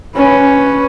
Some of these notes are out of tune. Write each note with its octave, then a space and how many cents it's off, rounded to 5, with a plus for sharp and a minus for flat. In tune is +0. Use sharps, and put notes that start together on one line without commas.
C#4 +0 B4 +0